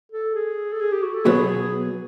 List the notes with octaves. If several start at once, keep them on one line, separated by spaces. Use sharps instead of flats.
A4
G#4
A4
G#4
G4
F#4
A4
B2 F#3 B3 G#4
G#4